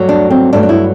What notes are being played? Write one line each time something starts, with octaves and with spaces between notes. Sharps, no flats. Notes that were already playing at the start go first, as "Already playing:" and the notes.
Already playing: G2 F#3 A3
D4
C4
G2 F#3 A3 D4
D4
E4